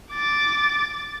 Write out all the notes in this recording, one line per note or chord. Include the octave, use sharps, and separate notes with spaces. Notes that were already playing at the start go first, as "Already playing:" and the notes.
D6 A6